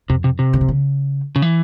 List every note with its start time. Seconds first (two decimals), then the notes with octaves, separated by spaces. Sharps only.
0.09 F2 C3
0.24 C3
0.39 C3
0.53 C#3
0.61 E3
0.68 C#3
1.36 C#3
1.42 E3